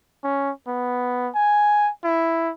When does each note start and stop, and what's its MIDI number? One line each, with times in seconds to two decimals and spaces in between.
0.24 0.51 61
0.67 1.30 59
1.35 1.90 80
2.04 2.52 64